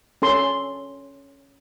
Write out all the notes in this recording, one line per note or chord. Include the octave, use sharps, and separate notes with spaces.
C#4 A4 C6